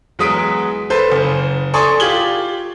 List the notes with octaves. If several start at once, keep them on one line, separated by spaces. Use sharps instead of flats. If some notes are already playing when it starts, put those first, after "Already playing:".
E2 F#3 G#3 D#6 B6 D7
A4 B4 C5
F#1
A4 D5 G#5 C6 C#6 D#6
F4 G4 G#6 F#7 G7